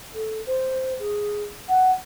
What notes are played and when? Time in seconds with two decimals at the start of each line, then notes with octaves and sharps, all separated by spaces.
0.14 A4
0.46 C5
0.99 G#4
1.69 F#5